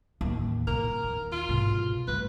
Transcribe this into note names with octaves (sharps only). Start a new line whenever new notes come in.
A1 D#2
A#2 A#4
D#2
F4
G#2 B2
G1 A3 B4